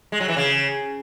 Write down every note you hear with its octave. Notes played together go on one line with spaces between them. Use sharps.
G#3
F#3
E3
C#3